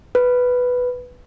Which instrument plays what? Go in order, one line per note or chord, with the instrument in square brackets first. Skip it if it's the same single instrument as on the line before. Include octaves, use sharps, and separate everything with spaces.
[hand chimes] B4